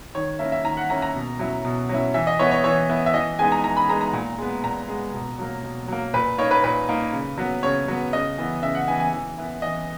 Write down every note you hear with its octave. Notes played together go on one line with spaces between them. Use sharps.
D#3 C#5
A#3 C#4 E4 E5
E5
D#3 A#5
F#5
A#3 C#4 E4 A#5
A#5
B2
F#3 C#4 E4
B2
F#3 C#4 E4
E3 E5
D#5
B3 E4 C#5
C#5
E3 C#5
B3 E4
E5
E3 D#5
G#3 B3 D#4 G#5
A#5
E3 A#5
B5
G#3 B3 D#4 A#5
A#5
A#2
G#3 B3
A#2 A#5
G#3 B3
B2
F#3 A#3
B2
F#3 A#3
A#2 B4
A#3 D#4 C#5
B4
A#2 B4
A#3 D#4
C#3
F#3 B3
C#3 C#5
F#3 B3
C#3 D#5
E3 B3 E4
C#3 E5
F#5
E3 B3 E4 G#5
G#5
E3
B3 E4
E3 D#5